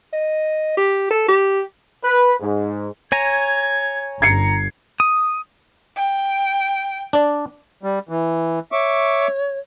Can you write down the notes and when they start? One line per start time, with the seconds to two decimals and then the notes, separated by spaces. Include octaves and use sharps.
0.13 D#5
0.77 G4
1.11 A4
1.28 G4
2.04 B4
2.40 G#2
3.12 C#5 G#5 A#5 G#6
4.22 G1 A#5 G#6 C7 C#7
5.00 D#6
5.97 G5
7.13 D4 D5
7.83 G3
8.09 E3
8.72 C#5 E5 C#6 D6